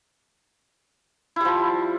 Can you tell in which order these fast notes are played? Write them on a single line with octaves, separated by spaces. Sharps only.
E4 G3 F3